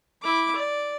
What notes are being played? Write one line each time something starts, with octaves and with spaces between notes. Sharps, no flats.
E4 D6
D5